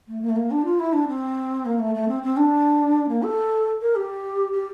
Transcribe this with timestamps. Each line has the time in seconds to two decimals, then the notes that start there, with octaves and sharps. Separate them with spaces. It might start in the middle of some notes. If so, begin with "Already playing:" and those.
0.08 A3
0.22 A#3
0.30 A3
0.36 A#3
0.51 D4
0.65 F4
0.79 E4
0.93 D4
1.08 C4
1.65 A#3
1.79 A3
1.95 A3
2.08 C4
2.23 C4
2.37 D4
3.09 A#3
3.23 A4
3.81 A#4
3.96 G4
4.52 G4